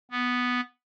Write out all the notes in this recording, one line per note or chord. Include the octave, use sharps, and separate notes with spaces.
B3